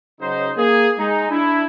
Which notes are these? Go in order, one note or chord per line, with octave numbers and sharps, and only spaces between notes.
C#3 F#3 D#4 C5
A#3 G#4
G#3 D#4
D4 E4